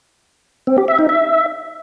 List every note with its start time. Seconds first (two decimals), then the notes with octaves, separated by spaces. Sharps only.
0.67 C4
0.78 G4
0.88 E5
0.99 D#4
1.09 E5